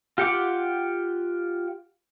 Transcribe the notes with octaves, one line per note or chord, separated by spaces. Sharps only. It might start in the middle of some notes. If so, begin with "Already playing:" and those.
F4 G4 F#5 G5 D6